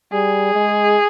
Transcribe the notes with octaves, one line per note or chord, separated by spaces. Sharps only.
G3 G#4
G#3